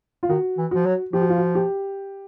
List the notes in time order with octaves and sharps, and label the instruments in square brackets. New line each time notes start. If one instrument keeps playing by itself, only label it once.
[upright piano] F4
[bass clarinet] D#3 [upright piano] F#4
[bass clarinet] E3
[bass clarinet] F3 [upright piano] F#4
[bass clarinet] F#3
[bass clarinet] F3 [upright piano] G4
[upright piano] F#4
F4
F#4
G4